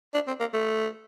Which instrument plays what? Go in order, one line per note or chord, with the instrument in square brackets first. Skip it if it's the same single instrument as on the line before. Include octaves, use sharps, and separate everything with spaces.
[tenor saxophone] D4
C4
A#3
A3